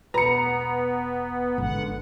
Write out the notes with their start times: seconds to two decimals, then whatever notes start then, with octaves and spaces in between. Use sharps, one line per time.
0.14 E1 B3 B4 A#5 C#7
1.58 G#1 D3 F#5